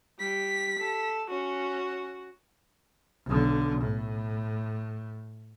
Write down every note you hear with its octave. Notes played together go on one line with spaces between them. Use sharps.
G3 B6
A4
C#4 F#4
B1 D3
A2